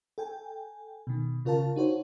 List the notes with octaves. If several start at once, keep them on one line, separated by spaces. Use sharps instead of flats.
A4 G5 G#5
B2 D#3
C#3 F4 A#4 F5 A5
D#4 F#4 C5 C#5